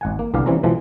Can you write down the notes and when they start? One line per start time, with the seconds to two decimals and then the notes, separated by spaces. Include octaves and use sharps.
0.01 G#1 F#5 G#5
0.19 A#3
0.34 C2 D3 B3 G4 F5
0.46 E3 G3 C4 C#4 A#5
0.63 B2 E3 F3 G#3